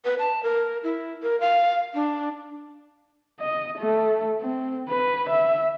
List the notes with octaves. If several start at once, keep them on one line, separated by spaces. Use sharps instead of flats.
B4
A5
A#4
E4
A#4
F5
D4
D#5
A3
C4
B4
E5